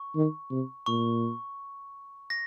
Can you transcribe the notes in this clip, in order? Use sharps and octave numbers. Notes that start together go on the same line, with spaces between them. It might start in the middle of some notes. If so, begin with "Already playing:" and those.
Already playing: C#6
D#3
C3
A#2 C#6
A#6